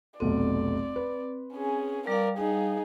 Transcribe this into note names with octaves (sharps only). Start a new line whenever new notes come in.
F1 B1 C4 A4 D5
B4
C#4 G#4
G3 A#4 D5 F5
D#4 G#4